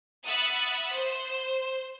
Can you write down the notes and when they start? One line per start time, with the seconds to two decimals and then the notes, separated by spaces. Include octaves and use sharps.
0.25 E5 F#5 B5 D#6 F#6 A6
0.92 C5